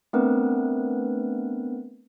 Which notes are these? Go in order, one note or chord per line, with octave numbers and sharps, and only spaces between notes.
A3 B3 C4 D4 A#4 B4